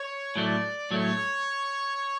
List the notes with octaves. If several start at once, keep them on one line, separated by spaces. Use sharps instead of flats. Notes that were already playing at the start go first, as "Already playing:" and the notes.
Already playing: C#5
A2 F#3 A3 D5
A2 F#3 A3 C#5